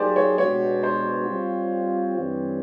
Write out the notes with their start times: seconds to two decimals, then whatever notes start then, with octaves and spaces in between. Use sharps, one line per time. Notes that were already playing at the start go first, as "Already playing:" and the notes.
Already playing: F#3 A#3 D#4 G4 G#4 C5 D5
0.16 C#5
0.38 B2 G#3 B3 D4 F#4 C#5
0.83 C5
1.28 G3 C4 F4
2.18 G2 E3 G3 C4